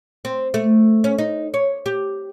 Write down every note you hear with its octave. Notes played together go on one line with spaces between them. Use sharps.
C4
A3
C#4
D#4
C#5
G4